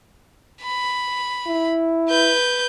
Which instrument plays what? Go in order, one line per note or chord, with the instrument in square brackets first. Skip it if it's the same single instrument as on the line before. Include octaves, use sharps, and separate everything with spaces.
[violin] B5
[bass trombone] E4
[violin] B4 G6